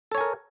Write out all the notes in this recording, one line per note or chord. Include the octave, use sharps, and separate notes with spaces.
A4 A#4 C#5 G#5